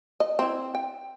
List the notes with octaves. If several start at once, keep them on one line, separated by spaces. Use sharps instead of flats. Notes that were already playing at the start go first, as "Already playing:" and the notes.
D#5
C4 E4
G5